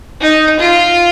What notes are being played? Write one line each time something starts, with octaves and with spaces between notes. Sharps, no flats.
D#4
F4